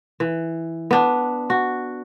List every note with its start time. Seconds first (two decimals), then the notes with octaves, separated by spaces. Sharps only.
0.20 E3
0.91 B3 D4
1.50 F#4